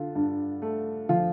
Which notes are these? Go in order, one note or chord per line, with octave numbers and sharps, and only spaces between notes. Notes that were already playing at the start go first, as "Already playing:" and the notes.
Already playing: D3 F4
G2
A3
F3 F4